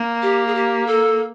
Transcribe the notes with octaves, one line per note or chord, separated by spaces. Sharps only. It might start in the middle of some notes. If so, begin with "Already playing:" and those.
Already playing: A#3
G4
G#4
G4
A4